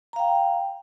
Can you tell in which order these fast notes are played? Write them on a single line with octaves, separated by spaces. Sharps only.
A#5 F5 G5